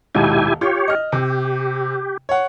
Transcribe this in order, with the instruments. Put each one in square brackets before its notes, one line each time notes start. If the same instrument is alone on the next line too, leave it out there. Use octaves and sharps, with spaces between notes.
[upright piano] D#1 G#2 B2 [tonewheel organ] E4 G4 G#5
[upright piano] F4 [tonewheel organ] G4 C#5
[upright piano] D#5 F6
[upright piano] C3 [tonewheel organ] G4
[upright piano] C#5 F#5